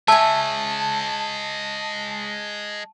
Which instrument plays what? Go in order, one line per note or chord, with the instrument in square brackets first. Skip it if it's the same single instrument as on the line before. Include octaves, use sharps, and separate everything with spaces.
[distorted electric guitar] G#3 C#5 [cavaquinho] E5 G#5 [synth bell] A5